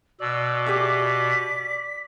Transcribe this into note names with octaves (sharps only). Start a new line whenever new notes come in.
B2 D5 E6
G4 G#4 E5 B6